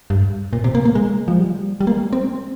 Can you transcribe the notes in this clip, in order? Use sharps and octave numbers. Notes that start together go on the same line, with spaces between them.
G2
A#2
C3
A#3
A#3
G#3
F3
G3
G3
A#3
G#3
C4